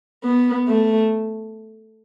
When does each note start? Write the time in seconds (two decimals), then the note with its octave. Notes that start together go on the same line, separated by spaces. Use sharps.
0.24 B3
0.68 A3